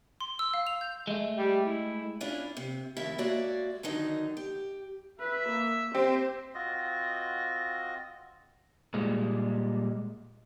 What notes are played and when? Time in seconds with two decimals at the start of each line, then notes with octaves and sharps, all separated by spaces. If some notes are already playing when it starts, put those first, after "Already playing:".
0.21 C6
0.39 E6
0.54 F5
0.67 F7
0.81 G6
1.07 G#3 A3
1.37 G3
1.65 E4
2.20 C#4 D4 E4 F4 C#5
2.57 C3
2.97 F2 A2 D#3 E4 F4 E5
3.18 G#3 A#3 F#4 C#5 D5 E5
3.83 D3 D#3 F#3 D#4
4.37 G4
5.20 B4 E5
5.49 A#3
5.95 C4 G4 C5
6.54 C4 F4 F#4 D#5
8.94 A#2 G3 G#3